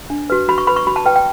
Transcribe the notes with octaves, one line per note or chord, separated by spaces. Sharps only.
D4
F#4 B4
F#4 B5
C#6
B4 B5
C#6
F#4 B5
A5
B4 G5
G5